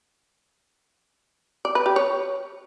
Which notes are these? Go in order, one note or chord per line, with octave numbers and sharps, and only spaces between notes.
D5
B4
G4
C#5